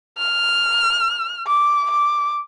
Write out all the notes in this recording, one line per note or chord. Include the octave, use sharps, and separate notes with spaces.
F6
D6
D6